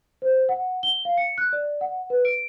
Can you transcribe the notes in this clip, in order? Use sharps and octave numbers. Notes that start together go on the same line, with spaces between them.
C5
F#5
G7
F5
C#7
F#6
D5
F#5
B4
D7